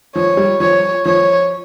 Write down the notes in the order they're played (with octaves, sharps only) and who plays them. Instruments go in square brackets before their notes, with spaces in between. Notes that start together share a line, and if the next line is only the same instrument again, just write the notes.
[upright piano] F3 [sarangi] C#5
[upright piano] G3
[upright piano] F3 [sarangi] C#5
[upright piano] F3 [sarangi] C#5